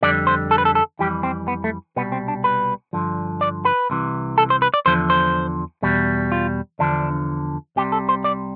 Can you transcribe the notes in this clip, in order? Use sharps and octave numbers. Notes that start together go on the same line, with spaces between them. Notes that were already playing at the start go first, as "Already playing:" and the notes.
F2 D3 G3 D5
C5
A4
B4
A4
A4
F2 E3 G3 G4
C4
B3
A3
C2 B2 G3 B3
C4
D4
B4
G2 D3 F3
D5
B4
C2 C3 E3
A4
C5
B4
D5
E2 D3 F3 C5
C5
E2 B2 G3
F4
E2 D3 F3 D4
C2 C3 G3 G4
A4
C5
D5